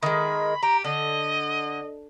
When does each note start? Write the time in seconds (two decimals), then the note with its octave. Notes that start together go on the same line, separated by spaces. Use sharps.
0.03 D#3 G#3 B5
0.63 G4 A#5
0.84 D3 D#5